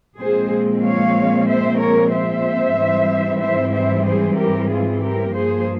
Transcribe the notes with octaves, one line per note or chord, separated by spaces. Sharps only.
A#2 F3 G#3 C4 G#4 C5
C#5 F5
C5 E5
A#4 C#5
C5 E5
G#2 E3 G3 C4
C5 E5
C5 E5
G#4 C5
G4 A#4
F4 G#4
G4 A#4
G2 F3 A#3 G#4 C5